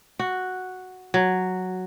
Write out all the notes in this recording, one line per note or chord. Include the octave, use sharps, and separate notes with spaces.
F#4
F#3